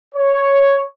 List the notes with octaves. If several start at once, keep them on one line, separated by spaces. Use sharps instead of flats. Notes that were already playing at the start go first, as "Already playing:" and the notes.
C#5